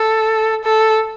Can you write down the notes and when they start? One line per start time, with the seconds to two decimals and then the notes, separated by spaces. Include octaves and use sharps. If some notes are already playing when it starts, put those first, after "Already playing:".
Already playing: A4
0.64 A4